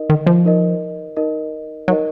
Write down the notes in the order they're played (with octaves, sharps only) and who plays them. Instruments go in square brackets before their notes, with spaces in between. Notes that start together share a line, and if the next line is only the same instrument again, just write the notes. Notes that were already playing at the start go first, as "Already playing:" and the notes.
Already playing: [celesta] D#4 A#4 D#5
[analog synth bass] D#3
F3
[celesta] D#4 A#4 D#5
D#4 A#4 D#5
[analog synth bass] F#3 [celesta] D#4 A#4 D#5